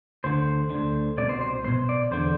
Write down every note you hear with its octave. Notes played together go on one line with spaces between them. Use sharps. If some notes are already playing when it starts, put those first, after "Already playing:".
D2 D3 C5
D2 D3
C2 B2 D5
C5
C5
C2 B2 C5
D5
E2 D3 C5